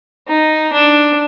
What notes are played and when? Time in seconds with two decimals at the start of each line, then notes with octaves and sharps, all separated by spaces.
0.28 D#4
0.73 D4